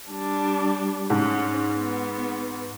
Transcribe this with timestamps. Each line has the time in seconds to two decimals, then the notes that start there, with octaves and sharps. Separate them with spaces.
0.10 G3 D4
1.10 G#2 C#4
1.75 B3